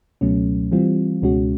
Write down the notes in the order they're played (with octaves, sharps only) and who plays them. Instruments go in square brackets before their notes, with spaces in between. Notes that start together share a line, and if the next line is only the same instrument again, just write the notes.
[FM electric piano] C#2 B2 F#3 A3 C#4
E3 G3 C4 F4
C#2 B2 G#3 C#4 F#4